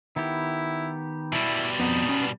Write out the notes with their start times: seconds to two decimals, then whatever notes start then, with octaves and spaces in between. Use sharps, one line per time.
0.16 D#3 B3 E4 G4
1.33 B2 G3 E4
1.80 F2 B3 D#4
2.09 B3 C#4